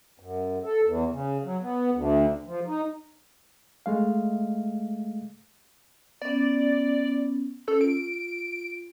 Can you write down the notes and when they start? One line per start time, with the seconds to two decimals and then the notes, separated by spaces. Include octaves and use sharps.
0.20 F#2
0.64 A4
0.84 E2
1.12 C#3
1.44 F#3
1.61 B3
1.93 D2
2.47 F3
2.67 D#4
3.86 G#3 A3 F5
6.22 B3 C#4 D5
7.68 C#4 A4
7.81 F4 D7